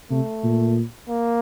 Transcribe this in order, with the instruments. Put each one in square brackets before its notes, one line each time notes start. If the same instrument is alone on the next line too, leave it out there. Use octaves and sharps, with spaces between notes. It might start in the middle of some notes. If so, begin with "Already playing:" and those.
[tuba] C3 [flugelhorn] A3
[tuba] A#2
[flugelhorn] A#3